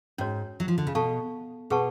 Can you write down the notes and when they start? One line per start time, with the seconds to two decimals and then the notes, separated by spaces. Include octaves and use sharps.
0.18 G#2 C#4 F#4 C#5
0.60 F#3
0.68 F3
0.78 D3
0.87 C#3
0.95 B2 A4 F5 A5 C#6
1.70 B2 G#4 B4 F#5 A5 C#6